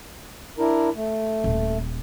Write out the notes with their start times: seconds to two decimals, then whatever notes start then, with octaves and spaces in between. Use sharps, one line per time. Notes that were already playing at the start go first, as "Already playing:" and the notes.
0.58 D4 E4 A#4
0.95 A3
1.44 D#1